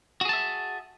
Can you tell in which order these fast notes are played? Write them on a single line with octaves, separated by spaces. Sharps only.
F#4 G#4 A5 E5